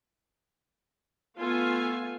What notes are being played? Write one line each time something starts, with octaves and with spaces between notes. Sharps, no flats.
A3 B3 F4 A4 F5 G#5